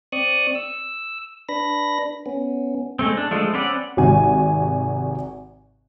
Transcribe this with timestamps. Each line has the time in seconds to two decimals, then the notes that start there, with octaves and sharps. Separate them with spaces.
0.12 C4 D5 C#6 D#6 F#6
0.55 E6
1.49 D4 B4 B5 A#6
2.26 B3 C#4
2.99 G#3 A3 C4
3.17 D4
3.31 F3 G#3 A3
3.54 C4 C#4 B4 D5 F#5
3.97 G#1 C3 F#4 G#5